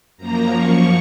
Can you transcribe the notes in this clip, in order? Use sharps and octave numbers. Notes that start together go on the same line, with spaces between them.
F#2 F3 A#3 A#5
C#6